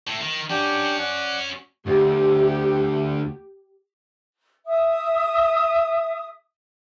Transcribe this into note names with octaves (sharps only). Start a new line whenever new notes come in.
A2
D#3
C#4 D4 F#4 G4 G5
D5 F#5
D2 G4
E5 D#6